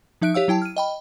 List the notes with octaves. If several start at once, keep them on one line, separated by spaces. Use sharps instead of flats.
F3 D#4 E5 F#6 D7
G4 C#5 F5 E6
F#3 E4 G5 A5
F6 D#7
D#5 G5 B5